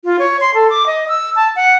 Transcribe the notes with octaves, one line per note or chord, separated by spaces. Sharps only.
F4
C#5
C6
A4
D6
D#5
E6
A5
F#5